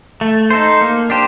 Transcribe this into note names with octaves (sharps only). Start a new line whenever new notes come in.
A3
D#4 A4 C5
A#3
D4 G4 C5